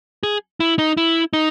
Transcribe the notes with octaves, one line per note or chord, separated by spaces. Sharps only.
G#4
E4
D#4
E4
D#4